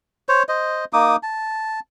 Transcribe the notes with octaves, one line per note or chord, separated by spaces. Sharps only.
C5 C#5
C5 D#5
A#3 D#4 D6 D#6
A5